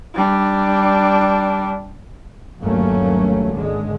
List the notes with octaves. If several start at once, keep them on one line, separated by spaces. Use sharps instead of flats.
G3 D4
G1 D#2 F#3 A3 A#3 C#4
G#1 D3 G#3